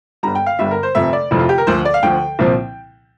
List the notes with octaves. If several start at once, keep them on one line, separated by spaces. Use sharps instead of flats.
G1 G2 D3 G3 A#5
G5
F5
G1 G2 D3 G3 E5
A#4
C5
F1 F2 C3 F3 E5
D5
F1 F2 C3 F3 E4
F4
G4
A#4
D2 D3 F3 C5
D5
F5
D2 D3 F3 G5
C2 A#2 F3 C4